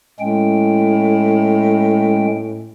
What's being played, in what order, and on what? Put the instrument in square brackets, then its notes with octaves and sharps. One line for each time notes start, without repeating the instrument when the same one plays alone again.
[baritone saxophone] A2 [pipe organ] G#3 C#4 G5